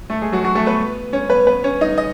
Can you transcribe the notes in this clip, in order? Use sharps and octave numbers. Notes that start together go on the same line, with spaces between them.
A3 A4
G#3 G#4
F#3 F#4
F#3 F#4
A3 A4
B3 B4
C#4 C#5
B3 B4
B3 B4
C#4 C#5
D#4 D#5
D#5